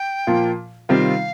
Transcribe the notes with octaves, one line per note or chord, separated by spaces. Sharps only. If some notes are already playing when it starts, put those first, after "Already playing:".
Already playing: G5
A#2 F3 A#3 F4
C3 D#3 G3 C4 F4 F5